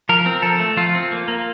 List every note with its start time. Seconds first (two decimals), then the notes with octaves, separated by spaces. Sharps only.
0.09 F3 A#4
0.26 C4
0.42 F3 A4
0.60 A3
0.77 F3 F4
0.95 C4
1.12 A#3
1.28 A#3